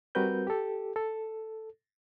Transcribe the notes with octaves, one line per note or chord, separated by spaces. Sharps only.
G3 C4 F#4 A#4 B4 G6
G4 A4
A4